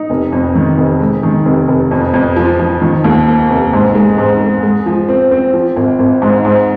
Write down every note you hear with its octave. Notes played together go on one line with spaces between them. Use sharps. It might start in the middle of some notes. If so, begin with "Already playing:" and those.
Already playing: D#4
F1
F2
D#3
F1
G#3
D#3
F1
F1
F2
F2
F3
F3
D#3
D#2
A#3
F1
G#2
G#3
G#2
G#3
G#3
F3
C4
C4
F3
G#1
G#1
G#2
G#2